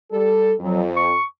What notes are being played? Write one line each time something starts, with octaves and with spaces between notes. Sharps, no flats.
G3 A4
F2 F#3
C#6